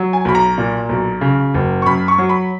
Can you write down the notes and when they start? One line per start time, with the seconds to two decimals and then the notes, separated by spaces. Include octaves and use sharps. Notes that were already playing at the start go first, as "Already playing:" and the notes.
Already playing: F#3
0.13 G#5
0.25 B1 B5
0.35 A#5
0.58 A#2
0.89 B1
1.21 C#3
1.54 F#1
1.82 C#6
1.86 F#2 B5
2.08 C#6
2.18 F#3
2.29 B5